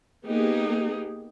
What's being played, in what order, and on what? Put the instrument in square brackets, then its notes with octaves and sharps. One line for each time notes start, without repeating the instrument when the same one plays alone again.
[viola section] A#3 B3 D#4 G4 G#4